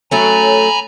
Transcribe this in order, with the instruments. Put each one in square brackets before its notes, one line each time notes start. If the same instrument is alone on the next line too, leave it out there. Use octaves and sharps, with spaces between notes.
[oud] F#3 A3 C#4 [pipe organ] G#5 A#5 B5